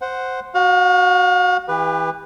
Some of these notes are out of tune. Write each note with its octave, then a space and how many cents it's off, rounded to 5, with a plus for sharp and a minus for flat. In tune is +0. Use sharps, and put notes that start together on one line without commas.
C5 -5 F#5 +0
F#4 +0 F5 +45
E3 -20 G4 +35 B4 +0